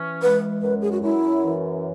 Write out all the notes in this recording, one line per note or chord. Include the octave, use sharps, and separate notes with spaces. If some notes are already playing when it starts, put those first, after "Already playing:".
Already playing: E3 C#4
G#3 B4
F#2 B4
G#4
F#4
F#2 E4
E3